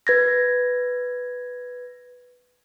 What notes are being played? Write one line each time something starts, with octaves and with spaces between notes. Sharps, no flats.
B4 G#6 A#6